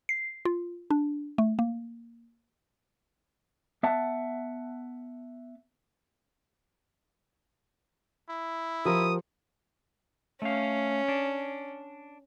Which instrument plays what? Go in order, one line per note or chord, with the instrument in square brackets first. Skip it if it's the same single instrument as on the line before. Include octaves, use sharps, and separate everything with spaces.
[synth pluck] C7
F4
D4
A3
A#3
[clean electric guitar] B3 E5 F#5 A5
[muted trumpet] E4
[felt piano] F3 [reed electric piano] G4 A#4 [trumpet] D#6
[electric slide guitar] A3 F5 [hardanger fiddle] C#4
[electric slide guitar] D4